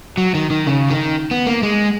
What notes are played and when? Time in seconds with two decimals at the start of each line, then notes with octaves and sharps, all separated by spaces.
0.17 F#3
0.35 D#3
0.51 D#3
0.67 C#3
0.90 D#3
1.31 B3
1.47 A#3
1.63 G#3